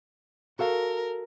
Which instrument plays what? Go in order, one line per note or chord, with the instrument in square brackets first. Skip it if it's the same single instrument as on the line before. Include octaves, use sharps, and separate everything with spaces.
[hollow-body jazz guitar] F#4 A4 F5 [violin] A#4